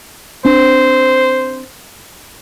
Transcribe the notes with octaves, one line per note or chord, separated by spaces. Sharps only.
C4 D4 C5